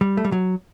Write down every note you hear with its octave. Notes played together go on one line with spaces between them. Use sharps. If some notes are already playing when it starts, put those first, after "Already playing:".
G3
A3
G3
F#3